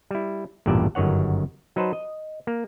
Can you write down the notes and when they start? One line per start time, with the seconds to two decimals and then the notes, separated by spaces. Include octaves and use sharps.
0.11 G3 E4
0.66 A1 E2 G2 A#2 D5 E5
0.95 G1 F#2 D#3 C#5 F#5
1.76 F#3 D#4 B4 C5 A5
1.93 D#5
2.47 A#3